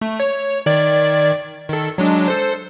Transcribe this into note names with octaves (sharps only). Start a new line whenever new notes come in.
A3
C#5
D#3 D5 G#6
D#3 A4
F#3 G#3 D4
A4 C5